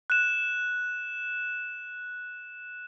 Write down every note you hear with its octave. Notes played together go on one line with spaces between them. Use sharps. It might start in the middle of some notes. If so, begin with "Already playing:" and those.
F#6 E7